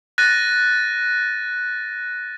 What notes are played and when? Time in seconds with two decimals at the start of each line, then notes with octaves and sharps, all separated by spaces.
0.18 F#6 A6 A#6 D#7